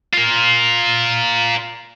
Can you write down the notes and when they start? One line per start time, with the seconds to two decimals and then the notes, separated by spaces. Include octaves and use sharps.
0.14 F4 A#4